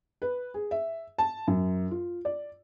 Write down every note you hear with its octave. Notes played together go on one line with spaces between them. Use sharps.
B4
G#4
E5
A5
F#2
F4
D5